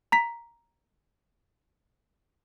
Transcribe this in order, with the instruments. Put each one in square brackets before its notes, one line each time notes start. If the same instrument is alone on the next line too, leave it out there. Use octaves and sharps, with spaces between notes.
[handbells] A#5 B6